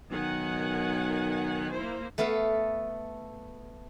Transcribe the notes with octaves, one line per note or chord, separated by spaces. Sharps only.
B1 D#3 F#5 G#5
A#3 E4 C5
A3 B3 A4 F5